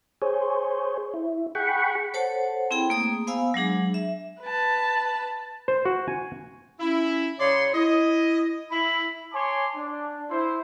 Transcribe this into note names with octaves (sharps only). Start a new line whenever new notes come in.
G#4 C5 C#5
E4
G#4 F#5 G5 B5 C#6
A4 C5 C#5 F#5 A5
C4 E4 G#4 G5 B5
A3 A#3 G#4 D#6
B3 C5 F5 G#5 B5 E6
F#3 G#3 D4 G#4
E5
B4 A5
C5
F#4
G#5
C#4 E4
C#3 C#5 D5 C6
E4 D#5
E4 B5
C#5 G#5 A5 C6 D6
D4
E4 C5